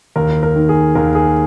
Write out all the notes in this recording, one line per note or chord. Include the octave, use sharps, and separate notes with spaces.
D#2 A#4
A#4
D#3
G#4
D#2 A#4
G#4